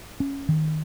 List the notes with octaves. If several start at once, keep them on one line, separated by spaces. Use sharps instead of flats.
C#4
D#3